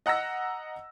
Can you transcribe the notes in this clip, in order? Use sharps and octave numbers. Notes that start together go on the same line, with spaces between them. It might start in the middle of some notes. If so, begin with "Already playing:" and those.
D#5 F#5 A#5 E6 A#6